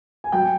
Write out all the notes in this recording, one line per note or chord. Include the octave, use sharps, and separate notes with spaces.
G#5
F#3 G5